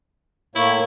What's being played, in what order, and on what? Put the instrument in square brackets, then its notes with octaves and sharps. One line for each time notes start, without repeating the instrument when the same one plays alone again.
[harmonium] A2 A#3 C#5 [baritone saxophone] E4